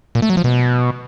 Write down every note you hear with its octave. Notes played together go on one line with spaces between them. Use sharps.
A#2
A3
F#3
F3
B2